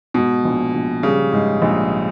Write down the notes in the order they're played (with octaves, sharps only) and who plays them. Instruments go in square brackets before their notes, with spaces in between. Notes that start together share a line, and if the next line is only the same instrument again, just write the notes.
[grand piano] G#2 [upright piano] B2
[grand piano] A#1
A#1
[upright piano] C#3 [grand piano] G3
[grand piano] G#2
A#1